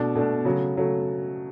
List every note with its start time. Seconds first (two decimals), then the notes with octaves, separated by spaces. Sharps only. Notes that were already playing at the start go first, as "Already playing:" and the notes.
Already playing: B2 A3 D4
0.16 B2 A3 D4
0.45 C#3 F#3 A3
0.75 C#3 F#3 A3